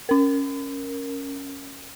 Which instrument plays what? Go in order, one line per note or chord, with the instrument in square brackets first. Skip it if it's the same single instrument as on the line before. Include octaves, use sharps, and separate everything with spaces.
[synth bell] C#4 A#4